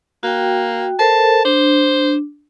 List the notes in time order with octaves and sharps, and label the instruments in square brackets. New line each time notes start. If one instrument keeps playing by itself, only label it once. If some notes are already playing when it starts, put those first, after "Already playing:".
[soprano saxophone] A#3 [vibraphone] F#4 G5
[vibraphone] A4 A#4 C5 [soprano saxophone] A5
[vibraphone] D4 [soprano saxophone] C5